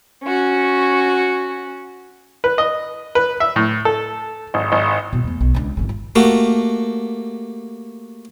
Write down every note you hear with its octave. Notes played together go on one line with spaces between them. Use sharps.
C#4 F#4
B4
D#5
B4
E5
A2
A4
G#1
G#1
B2 E4
E2 A3
B1
C#2 D4
G#1 C#3
F4
A3 A#3 F#4 G4